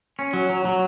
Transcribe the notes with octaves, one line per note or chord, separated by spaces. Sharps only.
C#4
F#3
F#3
F#3